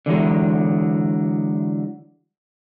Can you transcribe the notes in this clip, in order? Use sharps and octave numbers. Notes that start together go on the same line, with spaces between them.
D3 E3 F#3 G#3